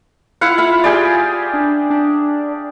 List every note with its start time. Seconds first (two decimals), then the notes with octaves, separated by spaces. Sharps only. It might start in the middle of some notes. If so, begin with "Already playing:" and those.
0.41 E4 F4 F5 F#5
0.58 E5 F5 B5
0.84 G4 G#4 D5
1.54 D4
1.90 D4